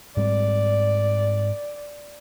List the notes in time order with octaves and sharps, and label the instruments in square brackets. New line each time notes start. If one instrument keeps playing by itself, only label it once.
[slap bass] G#2 G3 C4 [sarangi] D5